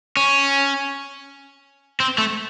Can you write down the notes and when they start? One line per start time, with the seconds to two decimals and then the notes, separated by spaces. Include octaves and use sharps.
0.17 C#4
2.00 C4
2.18 A3